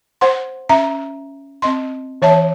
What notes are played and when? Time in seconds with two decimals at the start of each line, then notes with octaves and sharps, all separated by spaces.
0.21 C5 F#5 C6
0.69 C#4 E5 A#5
1.62 C4 D#5 C6
2.22 E3 C#5 E5 A5